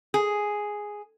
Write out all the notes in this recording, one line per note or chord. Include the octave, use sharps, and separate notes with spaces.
G#4